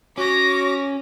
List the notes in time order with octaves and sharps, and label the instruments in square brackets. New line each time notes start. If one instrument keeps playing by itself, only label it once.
[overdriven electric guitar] C#4 [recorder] F#4 [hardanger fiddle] C#5 [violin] D6 A#6